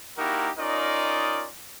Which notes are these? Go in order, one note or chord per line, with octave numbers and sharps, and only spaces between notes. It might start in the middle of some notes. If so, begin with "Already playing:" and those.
A#3 D#4 E4 F#4 G4 A#4
C#4 D#4 F4 A#4 D5 D#5